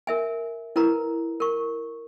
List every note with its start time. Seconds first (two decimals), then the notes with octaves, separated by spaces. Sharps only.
0.07 A#4 E5 G#5
0.76 E4 A#4 B4 A#5
1.40 A#4 C#6